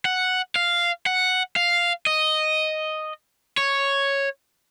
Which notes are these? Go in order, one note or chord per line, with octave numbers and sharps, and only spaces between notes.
F#5
F5
F#5
F5
D#5
C#5